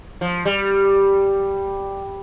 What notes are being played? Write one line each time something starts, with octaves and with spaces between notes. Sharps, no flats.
F3
G3